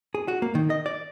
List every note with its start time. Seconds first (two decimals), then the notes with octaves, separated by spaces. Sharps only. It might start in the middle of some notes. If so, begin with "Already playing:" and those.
0.15 G#4
0.28 F#4
0.42 A#3
0.55 D#3
0.70 D#5
0.86 D5